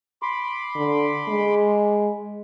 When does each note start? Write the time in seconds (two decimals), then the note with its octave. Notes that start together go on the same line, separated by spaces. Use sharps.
0.22 B5 C6 D6
0.75 D3
1.28 G#3